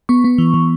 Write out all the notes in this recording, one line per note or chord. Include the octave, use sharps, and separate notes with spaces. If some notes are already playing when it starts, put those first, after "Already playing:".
B3 C#6
B3
E3
E3